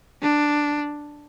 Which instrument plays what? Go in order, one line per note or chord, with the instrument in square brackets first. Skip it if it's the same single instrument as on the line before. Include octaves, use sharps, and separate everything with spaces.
[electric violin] D4